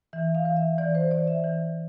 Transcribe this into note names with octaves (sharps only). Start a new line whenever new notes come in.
E3 E5
F5
E3
E5
E3 D5
C5
E3 D5
E5
E3